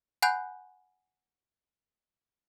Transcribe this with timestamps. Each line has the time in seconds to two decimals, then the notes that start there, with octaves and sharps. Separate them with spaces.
0.22 F#5 G#5 B5 F#6 G6